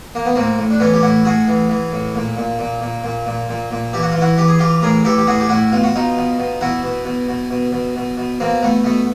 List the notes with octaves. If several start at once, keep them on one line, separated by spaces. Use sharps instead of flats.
A#3
B3
A2 A#3 C4
A2
D4
E3 B3 C#4
G4
A2 E4 F#4
A2 F#4 G#4
E3
E3
A2
A#2
A#2
A#2
A#2
A#2
A#2
A#2
A#2
E3 G4
F#4
F4
E3
E4 F#4
E3 G4
G#4
E3 F4 G4
A2 G#4 A#4
E3 G4 A4
G4
A2 F#4 G#4
G4
A2 E4 F#4
B2 F4
F#4
B2 D#4 F4
B2
B2
B2 E4 F#4
B2
B2
B2
B2
B2
B2
B2
B2 A#3 C4
B2 A3 B3
B2 A3 B3